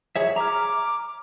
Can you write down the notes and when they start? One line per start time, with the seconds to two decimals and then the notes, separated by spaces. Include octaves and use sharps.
0.16 G#4 C#5 E5
0.36 A#5 D6 F6